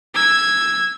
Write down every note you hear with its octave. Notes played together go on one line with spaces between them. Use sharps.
E6 G#6